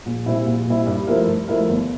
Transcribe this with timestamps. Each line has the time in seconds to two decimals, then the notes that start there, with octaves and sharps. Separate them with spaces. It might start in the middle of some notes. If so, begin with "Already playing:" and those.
0.06 A#1
0.26 A#2 G3 C4 E4
0.46 A#1
0.66 A#2 G3 C4 E4
0.87 G2
1.07 F3 A3 E4 A#4
1.27 G2
1.47 F3 A3 E4 A#4
1.68 G1